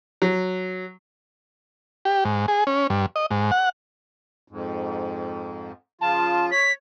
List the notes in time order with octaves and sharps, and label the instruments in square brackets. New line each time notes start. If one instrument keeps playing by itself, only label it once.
[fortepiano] F#3
[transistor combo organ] G4
G#2
G#4
C#4
G2
D#5
G#2
F#5
[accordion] F2 G#2
[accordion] C#3 F3 F4 [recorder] A5
[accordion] C#5 [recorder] B6